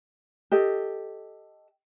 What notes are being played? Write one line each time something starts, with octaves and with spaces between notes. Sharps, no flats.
G4 A4 D#5